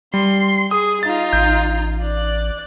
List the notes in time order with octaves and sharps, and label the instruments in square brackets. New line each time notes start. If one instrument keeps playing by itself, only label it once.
[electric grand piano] G3 [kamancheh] C6
[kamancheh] G#4 [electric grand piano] D#6
[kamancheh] D#4 F4 [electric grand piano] A6
[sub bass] A1 [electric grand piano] G6
[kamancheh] D5 F#6